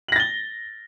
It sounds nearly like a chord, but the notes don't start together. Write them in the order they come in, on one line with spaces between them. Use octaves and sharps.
F#7 A#6 A6 G7